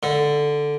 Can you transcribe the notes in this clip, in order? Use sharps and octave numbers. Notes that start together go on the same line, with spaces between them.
D3